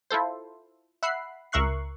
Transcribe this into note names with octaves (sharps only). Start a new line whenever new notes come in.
E4 F4 A4 C5
E5 F#5 B5 C7
C#2 A#4 E5 C#6 F#6 C7